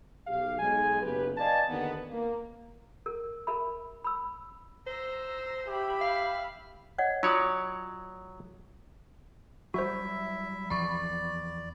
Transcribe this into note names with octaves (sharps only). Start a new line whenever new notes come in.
B1 G4 F5
B1 G#3 G#5
F#1 B1 G4 B4
D5 D#5 F5 G#5 A5
D#2 D3 D#3 B3
A#3
A#4
A#4 E5 B5
B5 E6
C5 A#5 E6
G4 E5 B5
F5
C#5 D#5 F#5
F#3 F4 C#5 D5 D#6
F#3 G3 E4 F#4 C5 E5
E2 F3 D5 B5 C#6